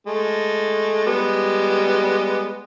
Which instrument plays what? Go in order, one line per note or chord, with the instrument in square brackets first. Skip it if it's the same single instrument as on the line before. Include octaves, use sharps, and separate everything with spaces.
[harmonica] G#3 A3
G3 G#3 B3